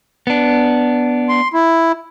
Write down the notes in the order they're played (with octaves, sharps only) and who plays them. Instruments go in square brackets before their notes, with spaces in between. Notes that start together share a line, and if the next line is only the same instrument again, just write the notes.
[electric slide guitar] B3 D4
[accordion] C6
E4